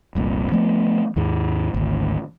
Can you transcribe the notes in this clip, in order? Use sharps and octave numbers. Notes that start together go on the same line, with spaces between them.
F1 C2 A#2
F3 A3 B3
D#2 G#2 G#3
G#1 D2